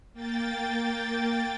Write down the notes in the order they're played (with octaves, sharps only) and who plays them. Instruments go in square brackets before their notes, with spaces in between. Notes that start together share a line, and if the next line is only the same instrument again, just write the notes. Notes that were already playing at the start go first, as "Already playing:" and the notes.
[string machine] A#3 G5 A6